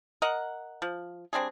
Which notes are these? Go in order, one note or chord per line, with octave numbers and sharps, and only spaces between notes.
A#4 D#5 F#5
F3
G3 C4 D4 G#4